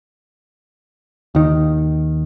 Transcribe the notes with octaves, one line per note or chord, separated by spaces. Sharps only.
D#2 D#3